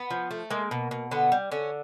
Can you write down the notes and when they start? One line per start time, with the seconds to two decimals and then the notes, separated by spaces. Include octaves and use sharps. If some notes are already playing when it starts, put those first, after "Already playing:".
Already playing: B3
0.10 F3
0.31 A3
0.50 G#3 A#3
0.71 B2
0.91 B2
1.11 D3 B3
1.32 G3
1.52 D3 C#4